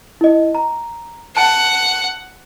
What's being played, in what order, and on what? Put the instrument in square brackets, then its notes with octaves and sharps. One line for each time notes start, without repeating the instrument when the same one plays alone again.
[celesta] E4 D#5
A#5
[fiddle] F#5 [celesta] A5